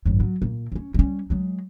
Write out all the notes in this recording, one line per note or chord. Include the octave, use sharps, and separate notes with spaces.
G#1 F#2
F#3
A#2
C4 C#4
G3 C#4
F#3 G#3